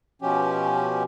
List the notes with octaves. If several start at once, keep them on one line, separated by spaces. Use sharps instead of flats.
B2 F3 C#4 G4